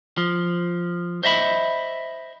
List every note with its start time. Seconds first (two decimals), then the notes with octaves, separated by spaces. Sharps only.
0.18 F3
1.23 C5 D#5 E5 B5